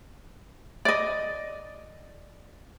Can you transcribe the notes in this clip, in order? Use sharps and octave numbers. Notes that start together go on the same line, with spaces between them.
D5 D#5